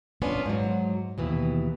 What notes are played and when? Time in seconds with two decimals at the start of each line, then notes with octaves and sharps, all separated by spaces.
0.22 B3 C#4 D4 F4
0.46 G#2 F#3
1.18 D#2 B2 E3